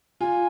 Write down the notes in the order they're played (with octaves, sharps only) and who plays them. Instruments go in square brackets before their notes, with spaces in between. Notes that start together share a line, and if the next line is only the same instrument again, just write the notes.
[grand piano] F4 [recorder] G#5